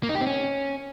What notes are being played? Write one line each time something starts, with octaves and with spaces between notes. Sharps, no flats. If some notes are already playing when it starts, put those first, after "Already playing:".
A#3
D#4
G4
C4
C#4